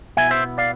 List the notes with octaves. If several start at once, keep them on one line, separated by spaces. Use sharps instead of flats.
B2 B3 E4 E5 G#5
C5 E5
D5 F5